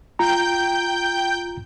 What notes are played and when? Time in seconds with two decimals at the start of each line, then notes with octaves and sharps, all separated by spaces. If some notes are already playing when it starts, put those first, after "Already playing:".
0.19 F4 G5 A#5 G6